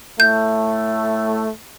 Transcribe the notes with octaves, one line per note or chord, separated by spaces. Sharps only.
A2 A3 G6